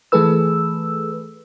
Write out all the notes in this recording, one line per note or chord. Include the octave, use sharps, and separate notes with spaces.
E3 A3 G#4 A4 B4 E6